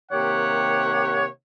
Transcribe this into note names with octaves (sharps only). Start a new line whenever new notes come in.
C3 D#3 A#3 G4 C#5 F#5